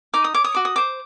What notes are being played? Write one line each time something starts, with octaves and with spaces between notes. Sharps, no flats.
D#4 D6
D#6
C#5 D6
D#6
F#4 D6
D#6
C5 D6